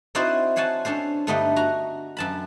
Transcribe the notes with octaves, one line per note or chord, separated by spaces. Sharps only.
C4 D#4 E4 F#4 C5 D5
C5 C#5 F#5 G#5 A5
C#4 D4 A4 C5
G2 D3 A3 B3 D#4 G4
F#4 A#5
F#2 A5 B5